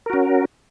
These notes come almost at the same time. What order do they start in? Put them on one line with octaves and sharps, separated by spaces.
A#4 F#4 C#4